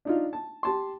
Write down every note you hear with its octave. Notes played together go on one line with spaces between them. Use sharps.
D4 D#4 F4
A5
G4 A5 C6